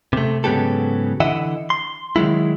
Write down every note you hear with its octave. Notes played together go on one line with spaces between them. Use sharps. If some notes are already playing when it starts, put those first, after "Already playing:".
C3 A3
G#2 C#3 F#3 B3 G4 A4
D3 E3 E4 D#5 E5 F#5
C6
D#3 F#3 G#3 E4